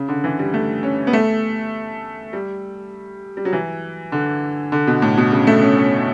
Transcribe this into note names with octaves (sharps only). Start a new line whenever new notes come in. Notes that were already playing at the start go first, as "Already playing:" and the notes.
Already playing: C#3
D3
E3
G3
A3
C#4
B3
A3
G3
G3
F#3
E3
D3
D3
B2
A2
B2
C#3
A3
C#4
C#4